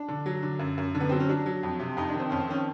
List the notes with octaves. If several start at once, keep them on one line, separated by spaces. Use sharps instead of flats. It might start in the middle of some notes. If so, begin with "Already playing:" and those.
Already playing: D4
D3
F#3
D3
F#2
F#2
D3
B3
F#3 C4
C#4
F#3 D4
F#3
F2
C3
F2 D#4
D4
D#3
C4
F2 C#4
C4
D#3 C#4